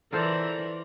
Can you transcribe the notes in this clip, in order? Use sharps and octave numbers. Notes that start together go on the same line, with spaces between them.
E3 F4 A4 A#4 C5 D5